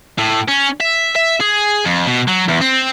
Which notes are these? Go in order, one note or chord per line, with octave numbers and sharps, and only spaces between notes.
A2
C#4
E5
E5
G#4
F2
B2
F#3
E2
C4